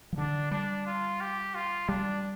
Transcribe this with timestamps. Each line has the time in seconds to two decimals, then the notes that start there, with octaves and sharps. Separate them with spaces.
0.13 F3
0.18 D3 D4
0.51 G3 D4
0.86 F4
1.21 G4
1.55 F4
1.89 G3 D4